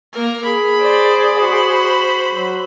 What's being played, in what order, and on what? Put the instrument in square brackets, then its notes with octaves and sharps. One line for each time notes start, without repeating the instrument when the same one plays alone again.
[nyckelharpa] A#3 A#4
[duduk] G#4 [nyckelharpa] B5
[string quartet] C5 D5
[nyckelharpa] F#4 [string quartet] C5 B5
[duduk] F#3